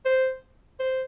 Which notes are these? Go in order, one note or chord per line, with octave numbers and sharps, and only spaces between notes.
C5
C5